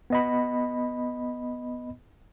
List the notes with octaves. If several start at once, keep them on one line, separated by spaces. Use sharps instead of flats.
B3 D#5 B5